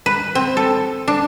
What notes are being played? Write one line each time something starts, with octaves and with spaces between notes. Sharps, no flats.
B4
C4
A4
D4